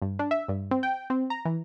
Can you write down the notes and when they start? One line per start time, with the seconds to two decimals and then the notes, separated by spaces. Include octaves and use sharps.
0.02 G2
0.19 D4
0.31 E5
0.48 G2
0.71 C4
0.83 G5
1.10 C4
1.30 A#5
1.45 E3